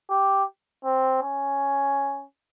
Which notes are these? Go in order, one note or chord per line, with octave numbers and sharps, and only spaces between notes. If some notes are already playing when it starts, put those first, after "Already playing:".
G4
C4
C#4